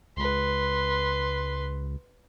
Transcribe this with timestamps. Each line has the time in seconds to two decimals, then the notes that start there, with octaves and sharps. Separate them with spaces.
0.17 C#2 B4 C6